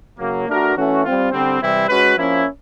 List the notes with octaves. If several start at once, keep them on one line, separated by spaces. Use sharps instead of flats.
C#3 F#3 A#3
A3 D4 F#4 A#4
E3 A3 C#4 F#4
G3 C4 F4
D3 G3 C4
C3 E3 G3 C4 E4
G#3 C#4 F#4 B4
F3 A#3 C#4 E4